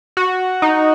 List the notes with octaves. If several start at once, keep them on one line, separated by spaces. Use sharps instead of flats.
F#4
D#4